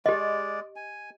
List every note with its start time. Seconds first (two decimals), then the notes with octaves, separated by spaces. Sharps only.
0.06 G#3 G4 D5 D#5
0.76 G#5